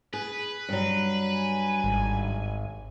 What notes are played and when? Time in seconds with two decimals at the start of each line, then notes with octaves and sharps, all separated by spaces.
0.13 G#4 B4
0.69 G2 F#3
1.35 G#5
1.84 G#1